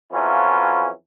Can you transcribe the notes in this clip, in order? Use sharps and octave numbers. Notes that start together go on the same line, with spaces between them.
F2 E3 F#3 C#4 E4 F4